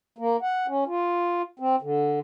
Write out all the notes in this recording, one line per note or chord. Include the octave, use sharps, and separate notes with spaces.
A#3
F#5
C#4
F4
C4
D3